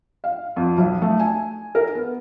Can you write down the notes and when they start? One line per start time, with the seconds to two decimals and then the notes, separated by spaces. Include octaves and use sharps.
0.24 F5
0.56 F2
0.77 B1
1.02 A3
1.19 G#5
1.75 A#4
1.95 B3